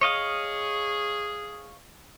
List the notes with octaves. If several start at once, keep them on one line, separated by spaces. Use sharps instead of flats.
G#4 C#5 D#5 F5